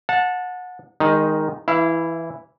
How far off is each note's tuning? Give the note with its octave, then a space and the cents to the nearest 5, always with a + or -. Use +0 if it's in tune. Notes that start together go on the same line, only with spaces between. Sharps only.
F#5 -25 A5 +0
D#3 +0 G#3 -25 D#4 +0
E3 +5 E4 +0 F5 -30